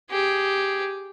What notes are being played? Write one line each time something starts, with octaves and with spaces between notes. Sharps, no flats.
G4 G#4